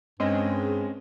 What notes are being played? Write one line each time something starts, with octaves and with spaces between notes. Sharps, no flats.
G2 G#3 C4 C#4 D#5